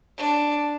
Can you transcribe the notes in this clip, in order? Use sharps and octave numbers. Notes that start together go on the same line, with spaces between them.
D4